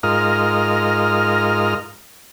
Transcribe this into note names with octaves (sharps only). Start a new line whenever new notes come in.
G#2 F4 A#4 D#5 F6